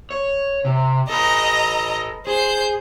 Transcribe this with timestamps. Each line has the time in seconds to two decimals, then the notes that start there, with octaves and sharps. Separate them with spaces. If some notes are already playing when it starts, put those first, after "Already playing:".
0.11 C#5
0.65 C3
1.10 A4 B4 D#5 A#5
2.27 G#4 C5 G6